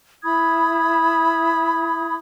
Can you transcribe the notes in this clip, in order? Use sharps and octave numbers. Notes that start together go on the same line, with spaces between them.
E4 B5 D#6 G#6